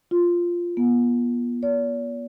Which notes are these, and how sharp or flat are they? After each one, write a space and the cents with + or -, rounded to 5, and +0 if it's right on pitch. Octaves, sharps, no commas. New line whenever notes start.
F4 -5
B3 -35
D5 -45